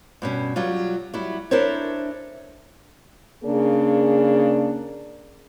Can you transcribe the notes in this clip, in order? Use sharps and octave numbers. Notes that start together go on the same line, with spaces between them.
G2 B2 C#4
F#3 G3 F4
F#3 G3 E4
D4 E4 A4 A#4 C5 C#5
C#3 A#3 D4 G#4